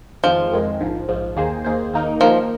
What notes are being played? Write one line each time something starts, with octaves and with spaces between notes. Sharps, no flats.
F2 D#3 F3 G#3
F2 D#3 G#3
A#1 G#2 F3
A#1 G#2 F3
D#2 D#3 A#3 G#4 C5
D#2 D#3 A#3 G#4 C5
D#2 D#3 A#3 D#4 A#4
D#2 D#3 F3 A#3 D#4 A#4